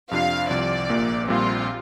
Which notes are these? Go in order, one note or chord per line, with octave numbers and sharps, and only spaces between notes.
F2 C3 F3 D4 F4 F5
C2 C3 F3 D5
A#1 A#2 A#3
A#1 A#2 G3 C4 F4